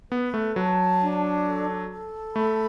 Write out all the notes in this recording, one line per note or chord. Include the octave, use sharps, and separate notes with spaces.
B3 B4
A3
F#3 A5
D4
A4
A4
A3 B5